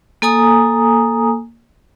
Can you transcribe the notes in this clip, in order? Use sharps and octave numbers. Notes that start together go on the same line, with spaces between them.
A#3 A4 G#5 A#5 D#6